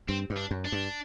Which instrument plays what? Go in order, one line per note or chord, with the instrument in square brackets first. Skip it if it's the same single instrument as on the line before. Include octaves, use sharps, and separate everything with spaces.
[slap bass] G2 [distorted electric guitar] C4
[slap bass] G2
[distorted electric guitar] D4
[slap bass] F#2
[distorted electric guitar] D4
[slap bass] G2